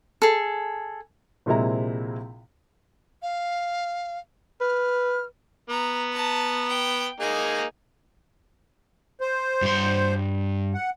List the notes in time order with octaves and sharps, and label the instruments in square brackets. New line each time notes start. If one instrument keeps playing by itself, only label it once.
[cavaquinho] G#4 A4
[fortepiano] A#1 C3 G#3 E4 A#5
[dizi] F5
[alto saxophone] B4 [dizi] F6
[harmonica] B3 [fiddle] A#5
[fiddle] A5 A#5
G5
[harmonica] A#3 D#4 G#4 [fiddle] G#5
[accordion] C5
[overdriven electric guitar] G2 C6
[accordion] F#5